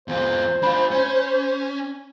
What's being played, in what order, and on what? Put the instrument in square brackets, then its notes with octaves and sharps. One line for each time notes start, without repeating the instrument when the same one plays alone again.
[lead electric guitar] E2 F4 [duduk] C5
[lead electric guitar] D4 F4 [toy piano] B5
[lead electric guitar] C#4